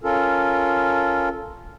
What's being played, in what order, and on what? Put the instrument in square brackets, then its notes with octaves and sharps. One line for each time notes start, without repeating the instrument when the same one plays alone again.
[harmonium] C#4 F4 A4 A#4